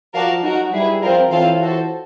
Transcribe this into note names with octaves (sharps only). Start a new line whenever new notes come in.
F3 F#4 A#4 D5 F5 A5
F#3 D#4 F#4 A#4
G3 E4 G#4 B4
F3 C4 F4 A#4
E3 C4 F4 A4 C#5 F5
F#4 A4 C5